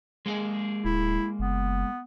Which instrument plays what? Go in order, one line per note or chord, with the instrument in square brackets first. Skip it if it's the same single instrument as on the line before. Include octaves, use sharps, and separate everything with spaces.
[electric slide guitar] G#3 A#3 G#4
[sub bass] D1 [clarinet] E4
[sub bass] F#1 [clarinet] B3